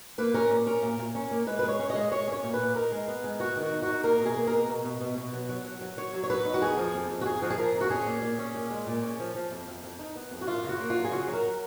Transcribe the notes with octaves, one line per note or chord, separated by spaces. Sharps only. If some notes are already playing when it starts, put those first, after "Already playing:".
A#3 B4
C#4 A#4
A#2
C#4 A#4
A#2
A#2
C#4
A#3
G#3 B4
B4
G#3
C#5
C#4
D#5
G#3
G#3 C#5
C#4 C#5
A#2
B4
A#2
D#4 A#4
G#3
B3
G#3
B3 F#4
D#3
F#4
D#4
F#4
D#4
A#3 A#4
B2
G#4
A#3
B2 A#4
B2
B2
B2
B2
F#3
F#3
F#3
F#3
F#3 C#5
F#3
C#5
F#3 B4
D#4
F#4
F2 G#4
F3
F2
F2
F#4
F2 G#4
F3 F#4
G#4
F3 A#4
F2
F#4
C#4 G#4
A#2
A#2
C#4
A#2
G#3
A#2
C#4
F3
F3
F2
F2
F2
D#4
B3
F2
F#4
F#2 F4
C#3
F#4
A#3
F4
F#3
G#4
C#3 F#4
F#3
A#4